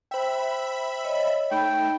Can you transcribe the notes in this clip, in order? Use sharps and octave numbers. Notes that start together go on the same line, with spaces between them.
C5 E5 G5 B5
C#5 D#5
A3 D#4 G5 B5